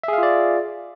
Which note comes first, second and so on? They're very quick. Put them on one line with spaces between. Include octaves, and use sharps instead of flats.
E5 G#4 F5 F4 D5